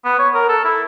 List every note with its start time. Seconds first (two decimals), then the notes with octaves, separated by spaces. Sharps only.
0.05 B3
0.19 C#5
0.34 A#4
0.49 A4
0.64 E4